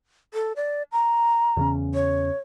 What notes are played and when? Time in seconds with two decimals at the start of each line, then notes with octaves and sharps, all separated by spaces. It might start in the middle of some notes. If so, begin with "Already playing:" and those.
0.34 A4
0.56 D5
0.92 A#5
1.57 E2 C#3 C#4
1.94 C#5